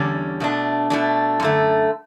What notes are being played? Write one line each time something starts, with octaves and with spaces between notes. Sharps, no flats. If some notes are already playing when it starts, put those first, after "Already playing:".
Already playing: E2 D3 G3 C#4
B2 A3 D4
B2 A3 D4
F#2 D3 A3